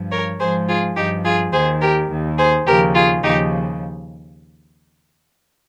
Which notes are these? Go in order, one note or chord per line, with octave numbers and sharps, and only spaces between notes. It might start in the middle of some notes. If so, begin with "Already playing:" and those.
Already playing: G2 F3
A#4 C#5
G#2 F3 G#4 C5
F4 G#4
G2 F3 D#4 G4
F4 G#4
D#2 D#3 G#4 C5
G4 A#4
D#2 D#3
G#4 C5
D#2 C#3 F3 G4 A#4
F4 G#4
D#2 C#3 F3 D#4 G4